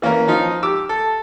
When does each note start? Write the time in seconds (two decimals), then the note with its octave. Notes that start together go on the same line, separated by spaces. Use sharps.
0.02 E3 A#3 C#4 A#4
0.27 F3 D#4 F4
0.63 G4 D6 E6
0.89 A4